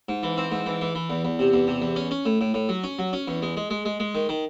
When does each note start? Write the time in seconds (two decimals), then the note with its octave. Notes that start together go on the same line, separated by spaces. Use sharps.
0.09 G#2
0.23 E3
0.38 C4
0.51 G#2
0.66 E3
0.81 E3
0.95 E3
1.10 E2
1.25 E2
1.39 C3
1.53 E2
1.67 C3
1.82 E2
1.96 C#4
2.11 C#4
2.26 A2
2.41 A2
2.54 A2
2.69 F#3
2.84 C#4
2.99 F#3
3.13 C#4
3.28 E2
3.42 G#3
3.57 G#3
3.70 G#3
3.85 G#3
4.00 G#3
4.15 D#3
4.29 D#3